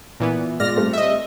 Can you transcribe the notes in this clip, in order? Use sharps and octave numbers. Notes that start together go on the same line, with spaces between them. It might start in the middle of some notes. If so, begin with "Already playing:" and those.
A#2 E3 B3
A#2 G#3 D5 F6 A#6
G3 A3 C4
D#5 E5